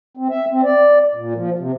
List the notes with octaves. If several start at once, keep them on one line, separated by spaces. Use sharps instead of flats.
C4
E5
C4
D5
A#2
F3
C3